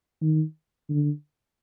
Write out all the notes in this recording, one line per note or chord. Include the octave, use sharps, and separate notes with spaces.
D#3
D3